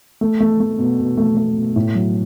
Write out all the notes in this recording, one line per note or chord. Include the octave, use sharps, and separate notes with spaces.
A3
A3
A3
B2
B2
A3
A3
B2
A2
F#3